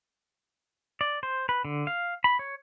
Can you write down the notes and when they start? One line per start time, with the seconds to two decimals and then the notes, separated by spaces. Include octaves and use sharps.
1.01 D5
1.23 C5
1.49 B4
1.65 D3
1.87 F5
2.24 B5
2.39 C#5